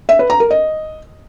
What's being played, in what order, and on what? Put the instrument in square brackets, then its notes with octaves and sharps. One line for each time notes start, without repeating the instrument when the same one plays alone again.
[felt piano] E5
B4
A#5
A#4
D#5